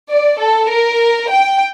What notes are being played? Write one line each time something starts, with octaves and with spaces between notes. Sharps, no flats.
D5
A4
A#4
G5